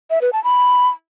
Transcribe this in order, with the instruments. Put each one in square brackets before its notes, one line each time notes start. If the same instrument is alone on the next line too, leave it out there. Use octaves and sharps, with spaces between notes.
[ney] E5
B4
A5
B5